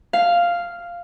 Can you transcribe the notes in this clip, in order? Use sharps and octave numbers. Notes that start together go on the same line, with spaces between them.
F5